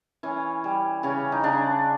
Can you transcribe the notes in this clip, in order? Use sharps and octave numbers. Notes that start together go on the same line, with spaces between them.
E3 C#4
G3
C#3 C#4
D#4
C#3 D4